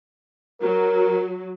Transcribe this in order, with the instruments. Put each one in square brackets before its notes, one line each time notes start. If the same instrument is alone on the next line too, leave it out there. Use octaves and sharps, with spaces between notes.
[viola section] F#3 [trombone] A#4